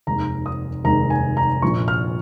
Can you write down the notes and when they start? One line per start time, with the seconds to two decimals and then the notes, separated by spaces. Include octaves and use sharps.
0.07 F1 D#2 D#3 G#3 A#5
0.46 D#6
0.84 F1 D#2 D#3 G#3 A#5
1.10 G#5
1.37 A#5
1.62 A#1 A#2 F3 C#6
1.88 F6